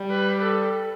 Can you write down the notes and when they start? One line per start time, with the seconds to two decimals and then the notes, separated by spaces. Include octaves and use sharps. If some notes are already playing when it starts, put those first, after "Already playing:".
Already playing: G3
0.11 B4
0.42 A4